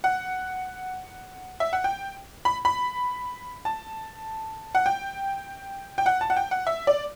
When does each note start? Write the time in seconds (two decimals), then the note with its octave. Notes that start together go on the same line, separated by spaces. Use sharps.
0.04 F#5
1.60 E5
1.73 F#5
1.84 G5
2.45 B5
2.65 B5
3.65 A5
4.75 F#5
4.86 G5
5.98 G5
6.06 F#5
6.21 A5
6.30 F#5
6.37 G5
6.51 F#5
6.67 E5
6.87 D5